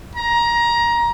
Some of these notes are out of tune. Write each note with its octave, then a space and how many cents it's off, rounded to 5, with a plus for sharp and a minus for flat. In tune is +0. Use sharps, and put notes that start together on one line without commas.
A#5 +20